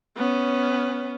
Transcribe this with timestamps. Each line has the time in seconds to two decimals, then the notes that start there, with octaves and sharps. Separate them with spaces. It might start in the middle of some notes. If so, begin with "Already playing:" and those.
0.16 B3 C#4